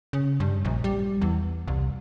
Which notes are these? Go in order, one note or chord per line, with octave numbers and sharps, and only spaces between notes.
C#3
G2
A#1
G3
E2
C2